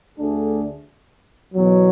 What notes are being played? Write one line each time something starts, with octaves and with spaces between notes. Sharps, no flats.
D2 D3 A3 D4 G#4
E2 B2 F#3